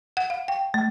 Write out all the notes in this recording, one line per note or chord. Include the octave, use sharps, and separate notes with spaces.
F#5
F5
G5
A3